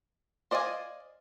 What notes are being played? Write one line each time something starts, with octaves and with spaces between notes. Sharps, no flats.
C5 D5 D#5 F5 G#5